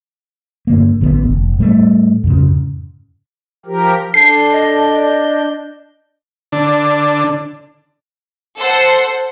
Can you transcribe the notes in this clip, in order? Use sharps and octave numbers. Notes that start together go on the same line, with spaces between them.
G2 D3 A#3
A1 D3 A#3 B3
F1
A2 G3 A3
F2 G#2 C#3
F3 G4 A#4
D4 A4 A5 G6 C7
D#5
D5
D3 D4
A4 C5 F#5